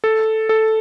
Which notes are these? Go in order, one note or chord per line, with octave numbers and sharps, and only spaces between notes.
A4
A4